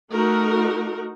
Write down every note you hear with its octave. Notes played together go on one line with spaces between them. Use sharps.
A3 D#4 F#4 A#4